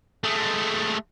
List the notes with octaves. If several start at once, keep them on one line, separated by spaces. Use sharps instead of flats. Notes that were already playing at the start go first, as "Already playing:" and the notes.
G#3 A3